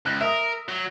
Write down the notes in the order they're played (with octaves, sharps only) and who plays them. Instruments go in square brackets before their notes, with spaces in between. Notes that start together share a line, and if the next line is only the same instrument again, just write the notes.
[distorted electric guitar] C#2 [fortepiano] F#6
[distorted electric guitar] A#4 [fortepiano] E5 D#6
[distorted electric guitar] F#3